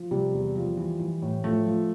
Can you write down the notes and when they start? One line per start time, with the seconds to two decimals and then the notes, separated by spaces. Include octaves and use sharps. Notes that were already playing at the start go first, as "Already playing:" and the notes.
Already playing: F3
0.11 C3 G3
0.33 E2
0.56 F3
0.77 E3
1.00 E3
1.22 A2
1.44 F3 A3
1.66 F3